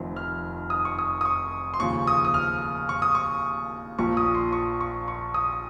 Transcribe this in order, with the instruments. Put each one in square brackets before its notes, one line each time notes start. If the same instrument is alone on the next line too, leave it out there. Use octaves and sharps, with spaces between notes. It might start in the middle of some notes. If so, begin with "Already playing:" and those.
Already playing: [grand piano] F1 F2 D#3
F6
D#6
C#6
D#6
D#6
C#6
C6
D#2 C#3 F3 C#6
D#6
D#6
F6
C#6
D#6
C#6
A#1 A#2 F3 C#6
D#6
C6
C#6
C#6
C#6
D#6